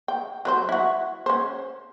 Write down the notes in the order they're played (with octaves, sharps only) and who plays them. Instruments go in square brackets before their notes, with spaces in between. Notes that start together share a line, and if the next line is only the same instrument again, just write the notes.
[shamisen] G5
F#3 B4 C5
E4 F#4
C#4 C5